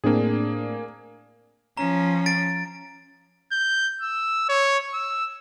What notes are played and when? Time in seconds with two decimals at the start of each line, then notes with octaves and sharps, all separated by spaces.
0.04 A2 A#3 C4 D4 G#4
1.77 F3 C#4 A#5
2.26 A6 D7
3.52 G6
4.01 E6
4.49 C#5
4.94 E6